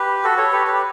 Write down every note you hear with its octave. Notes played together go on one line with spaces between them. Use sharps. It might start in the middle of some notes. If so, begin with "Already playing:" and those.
Already playing: G4 B4
F#4 A4
A4 C#5
G4 B4
G4 B4